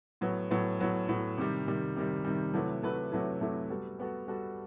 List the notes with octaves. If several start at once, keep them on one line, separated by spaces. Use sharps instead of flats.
A2 F#3 B3
A2 F#3 B3
A2 F#3 B3
A2 F#3 B3
C3 D#3 G3
C3 D#3 G3
C3 D#3 G3
C3 D#3 G3
C3 F#3 A3 E4 B4
C3 F#3 A3 E4 B4
C3 F#3 A3 E4 B4
C3 F#3 A3 E4 B4
G3 B3 F#4 A4
G3 B3 F#4 A4
G3 B3 F#4 A4